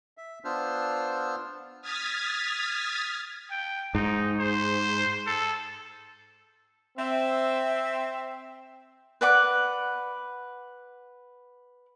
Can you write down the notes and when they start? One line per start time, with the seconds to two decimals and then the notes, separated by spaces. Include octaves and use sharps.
0.17 E5
0.45 B3 D4 F4 C5 E6 F6
1.81 D#6 F6 G#6 A6 B6
3.51 G5
3.95 G#2 D#4
4.40 C5
5.27 A4
6.98 C4 E5
9.21 B4 D5 F#5 D6